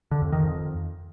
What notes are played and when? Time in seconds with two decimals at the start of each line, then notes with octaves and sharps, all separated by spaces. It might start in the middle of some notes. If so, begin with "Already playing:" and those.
0.11 D3
0.22 F2
0.32 D#3
0.43 F2